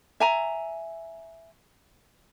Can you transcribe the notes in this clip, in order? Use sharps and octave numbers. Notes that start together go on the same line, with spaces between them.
E5 G#5 A#5